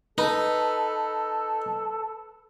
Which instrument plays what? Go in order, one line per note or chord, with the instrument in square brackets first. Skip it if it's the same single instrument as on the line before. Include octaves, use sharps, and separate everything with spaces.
[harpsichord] D#4 [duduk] A4 [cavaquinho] B4